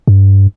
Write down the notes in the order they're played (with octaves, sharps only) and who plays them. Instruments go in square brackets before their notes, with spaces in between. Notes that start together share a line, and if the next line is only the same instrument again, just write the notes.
[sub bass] G2